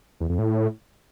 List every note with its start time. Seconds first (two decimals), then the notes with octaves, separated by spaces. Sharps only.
0.20 E2
0.29 F2
0.38 A2